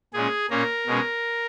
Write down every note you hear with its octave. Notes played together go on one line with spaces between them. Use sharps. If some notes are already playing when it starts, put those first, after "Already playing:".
A#2 G#3 C#4 G#4
A#2 A#3 C#4 A#4
B2 G#3 C#4